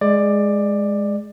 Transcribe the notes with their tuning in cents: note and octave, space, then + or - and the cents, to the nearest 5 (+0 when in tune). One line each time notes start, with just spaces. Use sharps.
G#3 +0 D5 +15